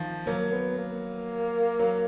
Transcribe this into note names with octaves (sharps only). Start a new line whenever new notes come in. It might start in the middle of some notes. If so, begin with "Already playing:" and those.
Already playing: D#3 F3
F#3 A#3
B3
A#3
F#3